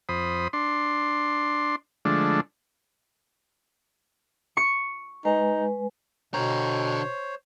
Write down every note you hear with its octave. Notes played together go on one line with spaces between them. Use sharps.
F2 C5 B5 D#6
D4 C6
D3 F3 G#3 A3 D4
C#6 C#7
G#3 D#4 B4 G#5
B2 D3 C5 C#5 A#5